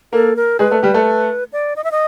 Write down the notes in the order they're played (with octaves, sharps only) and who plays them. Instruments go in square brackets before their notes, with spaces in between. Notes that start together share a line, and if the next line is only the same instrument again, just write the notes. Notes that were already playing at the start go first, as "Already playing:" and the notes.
[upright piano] A#3 A#4 [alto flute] A4
[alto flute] A#4
[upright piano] G#3 G#4 [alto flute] B4
[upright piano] A3 A4
G3 G4
A3 A4
[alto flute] D5
D#5
E5
D#5